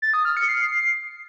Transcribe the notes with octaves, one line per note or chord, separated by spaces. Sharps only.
A6
D#6
F6
C#7
C7